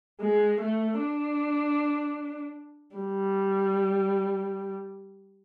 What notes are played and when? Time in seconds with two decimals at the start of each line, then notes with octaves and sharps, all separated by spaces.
0.21 G#3
0.60 A3
0.99 D4
2.96 G3